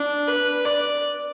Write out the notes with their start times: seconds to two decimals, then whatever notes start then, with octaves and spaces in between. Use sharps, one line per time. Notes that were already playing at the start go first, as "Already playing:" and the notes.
Already playing: D4
0.28 B4
0.65 D5